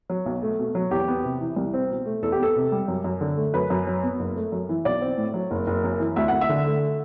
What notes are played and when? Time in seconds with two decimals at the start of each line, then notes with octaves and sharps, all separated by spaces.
0.10 F#3
0.26 B1
0.42 A3
0.59 B2
0.75 F#3
0.91 E2 G4
1.08 B3
1.24 C3
1.41 E3
1.56 C2
1.74 C4
1.90 B2
2.06 A3
2.22 E2 A4
2.32 G4
2.39 B3 A4
2.56 C3
2.72 G3
2.88 F#2
3.04 F#2
3.21 D3
3.37 A3
3.54 F#2 B4
3.70 F#2
3.87 F#3
4.03 B3
4.20 F#1
4.36 A3
4.52 F#2
4.69 E3
4.85 B1 D5
5.01 C4
5.18 A2
5.34 F#3
5.51 F#1
5.67 F#1
5.84 F#2
6.00 E3
6.16 D2 E5
6.28 D2 F#5
6.41 E5
6.49 D3
6.66 A3